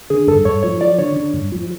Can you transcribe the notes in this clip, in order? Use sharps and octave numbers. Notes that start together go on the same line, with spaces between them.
D3 G#4
G2 A4
G2 C#5
F3 C#5
F3 D5
D3 C#5
D3
G2
F3